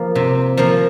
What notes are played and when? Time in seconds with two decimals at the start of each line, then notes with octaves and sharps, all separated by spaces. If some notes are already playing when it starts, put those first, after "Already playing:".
Already playing: F3 A#3
0.15 C3
0.57 F3 A#3